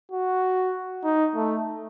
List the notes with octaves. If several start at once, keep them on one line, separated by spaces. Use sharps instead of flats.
F#4
D#4
A3